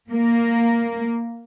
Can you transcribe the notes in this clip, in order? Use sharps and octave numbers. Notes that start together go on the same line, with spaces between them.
A#3